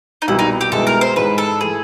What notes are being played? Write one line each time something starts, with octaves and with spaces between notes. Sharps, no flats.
D#4
C2 B2 G3 E4
D#4
G4
C2 B2 G#3 B3 E4 A4
A#4
C5
G#2 E3 G#3 B4
A4
E3 A3 G#4